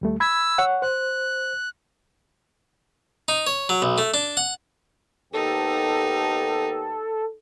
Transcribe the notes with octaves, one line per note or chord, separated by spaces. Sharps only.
D#2 G3 A3
B5 E6 G#6
C#5 F#5
C5 F#6
D#4
C#5
F#3
B1
A3
D4
F#5
D#2 B3 D#4 G4 A4